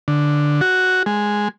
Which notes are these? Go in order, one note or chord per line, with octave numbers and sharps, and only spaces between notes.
D3
F#4
G#3